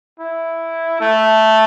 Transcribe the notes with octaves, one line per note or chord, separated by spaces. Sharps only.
E4
A3